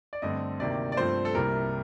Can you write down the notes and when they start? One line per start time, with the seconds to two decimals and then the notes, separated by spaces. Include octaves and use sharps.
0.13 D5
0.22 G2 D3 A3 C4 D#5
0.60 D2 C3 D#3 A#3 D5
0.92 D5
0.97 G2 F3 A3 C4 C5
1.25 A4
1.35 C2 C3 G3 A#3 A#4